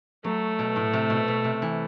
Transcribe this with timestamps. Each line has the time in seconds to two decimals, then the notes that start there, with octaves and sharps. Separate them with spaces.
0.24 F#3 A3
0.59 B2
0.76 A2
0.93 C3
1.10 B2
1.28 B2
1.44 C3
1.62 E3